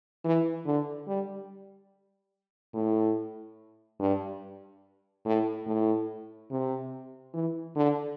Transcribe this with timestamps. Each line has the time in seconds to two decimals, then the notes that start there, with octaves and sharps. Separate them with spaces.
0.24 E3
0.66 D3
1.07 G3
2.74 A2
4.00 G2
5.25 A2
5.67 A2
6.51 C3
7.34 E3
7.76 D3